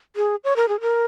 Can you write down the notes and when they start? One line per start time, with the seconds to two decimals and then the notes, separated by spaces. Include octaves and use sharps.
0.16 G#4
0.44 C#5
0.56 A#4
0.69 G#4
0.81 A#4